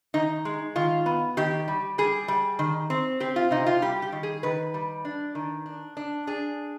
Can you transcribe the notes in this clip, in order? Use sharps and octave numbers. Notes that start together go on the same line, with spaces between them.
D#3 D#4
G#3
D#3 F4
B3
D#3 G4
G3
G3 G#4
G3
D#3
C4
C4 G4
F4
C3 D#4
F4
G3 G4
G4
D#3
G#4
D#3 B4
G3
D4
D#3
D4
D4
D4 G#4